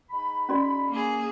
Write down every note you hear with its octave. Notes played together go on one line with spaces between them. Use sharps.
G#3 D#4 B5
C#4 F#4 D5
A#3 G#4